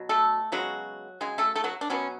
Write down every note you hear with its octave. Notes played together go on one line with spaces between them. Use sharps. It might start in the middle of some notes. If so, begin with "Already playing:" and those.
Already playing: B2 F#3
A3 A4
C#3 F#3 G#3 B3 F#4
C#3 F#3 G#3 G#4
A3 A4
A3 A4
F#3 F#4
D4
B2 F#3 B3 C#4